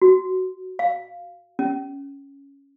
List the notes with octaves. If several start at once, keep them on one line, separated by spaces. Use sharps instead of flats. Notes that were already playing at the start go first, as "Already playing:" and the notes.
F#4
F5
C#4